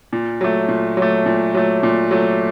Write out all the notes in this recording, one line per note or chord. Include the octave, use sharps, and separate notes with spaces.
A#2
F#3 A3
A#2
F#3
A3
A#2
F#3 A3
A#2
F#3 A3